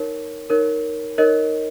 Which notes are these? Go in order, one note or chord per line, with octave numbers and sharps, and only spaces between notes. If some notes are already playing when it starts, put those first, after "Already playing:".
Already playing: D#4 A#4 C#5
D#4 A#4 C#5
D#4 A#4 C#5 D#5